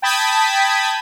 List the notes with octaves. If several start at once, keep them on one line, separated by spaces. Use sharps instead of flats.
G5 A5 B5 D#6 G#6 B6